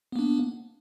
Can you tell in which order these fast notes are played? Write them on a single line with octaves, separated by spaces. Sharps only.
B3 A#3 D4